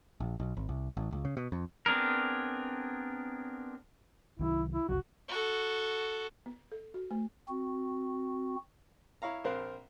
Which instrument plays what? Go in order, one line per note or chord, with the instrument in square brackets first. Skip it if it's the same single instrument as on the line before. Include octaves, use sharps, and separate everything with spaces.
[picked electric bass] A#1
B1
G#1
C2
A1
C#2
C#3
B2
F2
[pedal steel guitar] B3 C4 D4 G#4 A#4
[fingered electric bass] C2 D#3 F#3 [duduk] E4
[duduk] E4
[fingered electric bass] F#1 C2 F#3 [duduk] F#4
[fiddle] F#4 A4
[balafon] B3
A4
F#4
A3
[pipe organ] C4 F#4
[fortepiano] E4 C#5 F5 A#5
A#1 C4 A#4 C5 F5 F#6